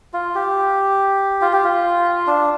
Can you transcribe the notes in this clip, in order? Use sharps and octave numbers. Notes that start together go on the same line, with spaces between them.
F4
G4
F4
G4
F4
D4